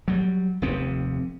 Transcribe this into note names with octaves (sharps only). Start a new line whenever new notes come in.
F#3 G3
F1 D#2 C3 C4